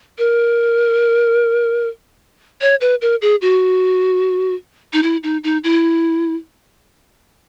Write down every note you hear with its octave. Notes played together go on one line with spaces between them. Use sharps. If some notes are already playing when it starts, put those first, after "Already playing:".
A#4
C#5
B4
A#4
G#4
F#4
D#4
E4
D#4
D#4
E4